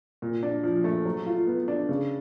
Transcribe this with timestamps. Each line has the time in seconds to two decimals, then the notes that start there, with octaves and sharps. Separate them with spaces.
0.22 A#2
0.43 D4
0.63 F3
0.84 A3
1.05 F#3
1.26 F4
1.47 B3
1.68 D4
1.89 C#3